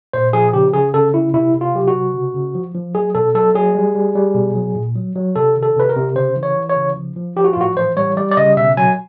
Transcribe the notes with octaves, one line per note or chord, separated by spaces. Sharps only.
A#2 C5
F3 G#4
C#3 G4
C#3 G#4
C#3 A4
C#3 E4
C3 E4
C3
F4
F#3 G4
F#4
C3
C#3
C#3
F3
F3
F#3 G#4
B2 A4
F#3 A4
F#3 G#4
G3
G3
G3
B2
F#3
A#2
F#3
F#3
C3 A4
D#3
A4
C3 B4
A#4
C3
C#3 C5
E3
C#5
E3
C#5
C#3
F3
F3
F3 G4
F#4
F4
A2 F#4
E3 C5
G3 C#5
G3 D5
D5
C#3 D#5
B2 E5
F#3 G#5